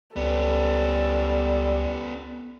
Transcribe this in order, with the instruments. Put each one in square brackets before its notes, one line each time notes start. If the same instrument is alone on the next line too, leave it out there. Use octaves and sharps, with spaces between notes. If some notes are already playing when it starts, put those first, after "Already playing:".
[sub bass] C#2 [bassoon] G3 [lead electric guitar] B3 C#4 [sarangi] A4